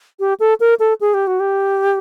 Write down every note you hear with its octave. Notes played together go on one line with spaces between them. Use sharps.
G4
A4
A#4
A4
G#4
G4
F#4
G4